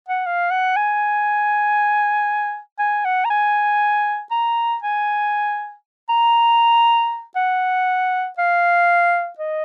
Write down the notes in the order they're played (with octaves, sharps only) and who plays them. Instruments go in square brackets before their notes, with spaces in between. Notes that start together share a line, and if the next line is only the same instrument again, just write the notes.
[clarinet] F#5
F5
F#5
G#5
G#5
F#5
A#5
G#5
A#5
G#5
A#5
F#5
F5
D#5